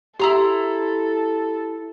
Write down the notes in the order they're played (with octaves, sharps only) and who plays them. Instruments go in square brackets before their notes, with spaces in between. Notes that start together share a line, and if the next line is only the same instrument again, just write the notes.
[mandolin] E4 A#5 C6 [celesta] G4 [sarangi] A4